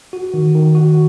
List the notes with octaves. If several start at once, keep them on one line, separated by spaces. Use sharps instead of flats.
F#4
D#3
D#3
F#4